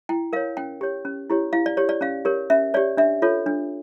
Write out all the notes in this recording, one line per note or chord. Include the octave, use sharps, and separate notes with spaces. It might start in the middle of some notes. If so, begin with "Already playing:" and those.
E4 G5
A#4 C#5 F5
C#4 G5
G4 C#5
C#4
E4 G4 C#5
E4 F5
D5
G4 C#5
D5
C#4 F5
G4 A#4 C#5
C#4 E5
G4 C#5 D5
D4 E5
F4 A4 C#5
D4